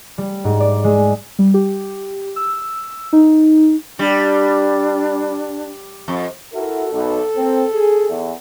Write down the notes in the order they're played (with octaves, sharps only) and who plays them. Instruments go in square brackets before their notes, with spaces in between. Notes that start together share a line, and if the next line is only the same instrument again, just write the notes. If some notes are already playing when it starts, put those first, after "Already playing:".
[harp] G3
G#2
D5
G#3
[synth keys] G3
G4
E6
D#4
[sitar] G3 [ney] D4
[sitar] F2
[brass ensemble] E4 F#4 A#4 [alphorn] A4
[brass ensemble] B1
A#3 C4
G#4
E2